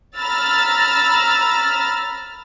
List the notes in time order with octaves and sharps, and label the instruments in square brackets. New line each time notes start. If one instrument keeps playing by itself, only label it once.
[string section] A#5 B5 E6 F6 A6